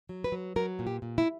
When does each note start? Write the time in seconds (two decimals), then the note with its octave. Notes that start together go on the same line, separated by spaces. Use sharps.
0.09 F#3
0.24 B4
0.32 F#3
0.56 F#3 A#4
0.79 A#2
0.87 G4
1.02 A#2
1.18 E4